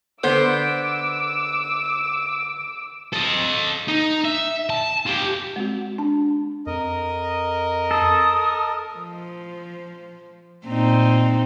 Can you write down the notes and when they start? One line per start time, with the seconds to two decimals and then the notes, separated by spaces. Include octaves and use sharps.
0.24 D3 B3 C5 D6 E6
3.13 A4 D#5
3.88 D#4
4.25 E5
4.70 A5
5.07 F4 G4
5.56 G#3 C4 F#4
5.98 D4 A5
6.67 F2 A#4 D#5
7.91 A4 D#6
8.94 F3
10.66 A#2 C4 D#4